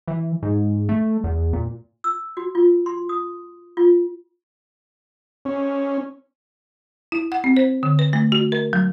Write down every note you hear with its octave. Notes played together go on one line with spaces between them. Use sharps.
E3
G#2
A3
E2
A#2
E6
F#4
F4
C6
D#6
F4
C#4
E4
F#5
C4
C5
D3
B4
A3
F#4
A#4
F#3